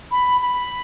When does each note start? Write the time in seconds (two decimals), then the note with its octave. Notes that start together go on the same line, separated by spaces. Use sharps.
0.11 B5
0.41 B5